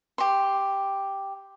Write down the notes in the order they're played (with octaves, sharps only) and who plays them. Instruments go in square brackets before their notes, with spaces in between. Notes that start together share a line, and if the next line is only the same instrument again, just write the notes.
[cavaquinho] G4 C6